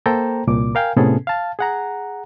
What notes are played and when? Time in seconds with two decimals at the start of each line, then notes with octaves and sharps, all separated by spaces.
0.06 A#3 A4 C5 G5 A#5
0.47 C2 A#2 D6
0.75 A#4 F5 G5 G#5
0.96 A2 C3 B3 C#4 G#4 A4
1.27 F5 A5
1.59 G#4 F#5 A#5